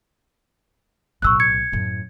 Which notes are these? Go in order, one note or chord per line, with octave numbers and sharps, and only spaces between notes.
B1 A2 C#6 E6 F#6
G#6 C#7
F#2 A2